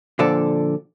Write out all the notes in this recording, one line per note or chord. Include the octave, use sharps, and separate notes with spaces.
A#2 D3 F3 A4 D5